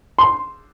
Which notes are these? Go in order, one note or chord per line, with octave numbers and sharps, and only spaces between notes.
C6